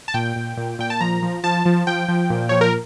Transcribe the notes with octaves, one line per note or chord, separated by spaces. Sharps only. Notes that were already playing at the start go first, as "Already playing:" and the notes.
A5
A#2 G5
A#2
A#2
A#2 G5
A5
F3 A#5
F3
F3 A5
F3
F3 G5
F3
A#2
F3 C#5
A#4